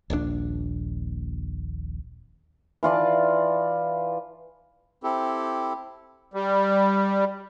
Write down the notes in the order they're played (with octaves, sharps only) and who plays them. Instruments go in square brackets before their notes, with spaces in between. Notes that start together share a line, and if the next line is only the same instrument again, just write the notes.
[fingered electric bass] D#1 A#1 B2 D4
[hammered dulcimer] E3 F4 D5 A5
[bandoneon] C4 E4 G4 A4
[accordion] G3